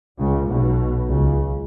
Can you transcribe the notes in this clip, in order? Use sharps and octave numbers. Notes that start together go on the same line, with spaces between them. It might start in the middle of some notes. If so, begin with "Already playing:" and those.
C#2 C#3
B1 B2
C#2 C#3